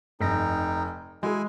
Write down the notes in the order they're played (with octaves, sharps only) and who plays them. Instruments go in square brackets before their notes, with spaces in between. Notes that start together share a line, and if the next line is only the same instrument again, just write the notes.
[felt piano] F1 [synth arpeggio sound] G2 A#6 [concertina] D#4 G5
[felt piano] G#3 [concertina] E4 G#5 [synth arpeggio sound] F#4 G#4